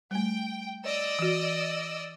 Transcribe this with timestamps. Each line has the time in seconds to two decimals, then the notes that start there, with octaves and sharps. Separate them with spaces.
0.11 G3 A3 G5
0.85 D5 D#5 E6
1.19 E3 F#4